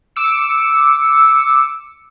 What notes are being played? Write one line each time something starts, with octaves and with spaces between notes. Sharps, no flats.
D6 E6 C#7